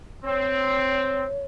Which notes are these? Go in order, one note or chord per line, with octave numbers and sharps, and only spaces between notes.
C4 C#5